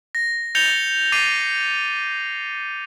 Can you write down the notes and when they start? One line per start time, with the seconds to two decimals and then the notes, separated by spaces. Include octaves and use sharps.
0.15 A#6
0.55 G6 A6 A#6 C#7 F7 G7
1.12 D6 A6 C7 D#7